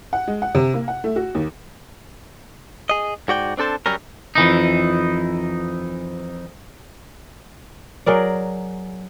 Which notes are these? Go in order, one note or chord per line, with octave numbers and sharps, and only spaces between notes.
F#5
G#3
F#5
C3
A#3
F#5
A3
F#4
D#2
G#4 D#5
G#2 F#4 D5 G5
C4 D4 A4 C5 A5
F#2 F#3 G3 C#4 A#4
F2 E3 D#4
F#3 G#4 A#4 D5